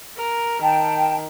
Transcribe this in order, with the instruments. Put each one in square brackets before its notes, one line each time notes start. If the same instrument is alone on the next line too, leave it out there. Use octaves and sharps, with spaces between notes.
[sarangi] A#4
[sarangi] D#3 [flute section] G5 A5